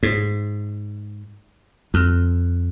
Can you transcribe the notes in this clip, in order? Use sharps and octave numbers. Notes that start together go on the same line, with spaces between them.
G#2
F2